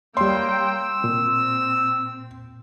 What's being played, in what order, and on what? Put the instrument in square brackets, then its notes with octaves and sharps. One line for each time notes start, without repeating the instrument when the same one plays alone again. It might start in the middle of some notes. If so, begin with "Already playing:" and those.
[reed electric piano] G3 C#5 [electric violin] A#3 G5 [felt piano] C6 [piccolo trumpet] E6
[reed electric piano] A#2 [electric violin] C4